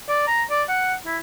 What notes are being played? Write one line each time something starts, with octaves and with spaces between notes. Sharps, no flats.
D5
A#5
D5
F#5
E4